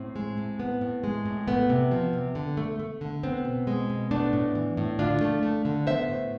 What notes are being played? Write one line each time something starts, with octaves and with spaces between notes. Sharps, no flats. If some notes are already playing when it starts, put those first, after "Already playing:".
Already playing: A2 C4
G#3
A2
B3
A2
G#3
A2
A3 B3
C3
F3
C3
D3
A3
A3
D3
B3 C4
B2
G#3
B2
A3 B3 D4
A2
E3
A2
D3 D4 F4
A3
A3
D3
B3 C5 E5
A2